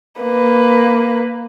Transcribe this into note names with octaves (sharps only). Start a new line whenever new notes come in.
A#3 B4